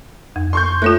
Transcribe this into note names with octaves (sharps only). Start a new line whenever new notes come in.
F2
C6 C#6 G6
A3 F4 C#5 F#6